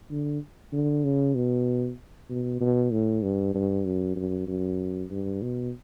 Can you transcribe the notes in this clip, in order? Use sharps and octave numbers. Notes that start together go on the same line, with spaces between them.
D3
D3
C#3
B2
B2
B2
A2
G2
G2
F#2
F#2
F#2
G2
B2